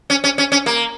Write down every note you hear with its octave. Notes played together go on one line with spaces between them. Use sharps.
C#4
C#4
C#4
C#4
A#3